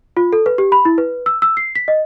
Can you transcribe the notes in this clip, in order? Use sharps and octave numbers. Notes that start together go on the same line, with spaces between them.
F4
A4
B4
G4
B5
E4
B4
E6
E6
C7
B6
D#5